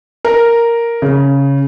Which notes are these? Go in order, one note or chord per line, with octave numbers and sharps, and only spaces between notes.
A#4
C#3